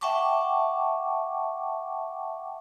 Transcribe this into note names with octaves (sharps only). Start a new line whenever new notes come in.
E5 F#5 G5 A5 C#6 D6